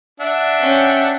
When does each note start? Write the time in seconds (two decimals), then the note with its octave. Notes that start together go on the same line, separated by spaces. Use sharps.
0.20 D4 E5 F#5
0.60 C#4 G5